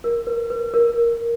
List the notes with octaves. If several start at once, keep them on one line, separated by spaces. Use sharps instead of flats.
A#4
B4
B4
A#4